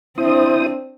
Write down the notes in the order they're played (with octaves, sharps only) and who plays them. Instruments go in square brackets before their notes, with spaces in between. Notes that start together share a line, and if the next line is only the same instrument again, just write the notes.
[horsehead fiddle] C4 D4 [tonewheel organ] E4 C5 D#6